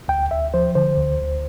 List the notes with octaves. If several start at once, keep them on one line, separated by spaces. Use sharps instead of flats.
D2 G5
D2 E5
F3 C5
D3 C5
D2
D2